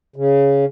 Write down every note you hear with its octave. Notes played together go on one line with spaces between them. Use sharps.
C#3